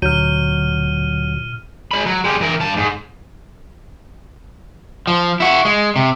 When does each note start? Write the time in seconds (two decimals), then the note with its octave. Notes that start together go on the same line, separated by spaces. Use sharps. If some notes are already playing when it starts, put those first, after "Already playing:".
0.02 D2 A#2 F#3 F6 G6 D#7
1.91 G#3 B5
2.06 F#3
2.24 G#3 G4
2.41 E3 A#4
2.61 G2 A5
2.77 G#2
5.07 F3
5.40 E4 F#4
5.65 G#3
5.96 C3